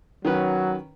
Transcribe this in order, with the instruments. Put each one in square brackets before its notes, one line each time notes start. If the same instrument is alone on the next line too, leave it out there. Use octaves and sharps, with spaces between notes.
[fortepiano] D#3 C#4 B4 [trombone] F#3